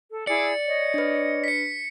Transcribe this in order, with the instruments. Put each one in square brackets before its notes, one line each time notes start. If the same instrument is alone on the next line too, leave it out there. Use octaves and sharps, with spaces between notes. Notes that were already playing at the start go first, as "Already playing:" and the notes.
[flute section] A4
[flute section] E4 G#4 E6 [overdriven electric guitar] D5 [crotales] C#7
[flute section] C#5 D#5
[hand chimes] D4 B4
[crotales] B6 C#7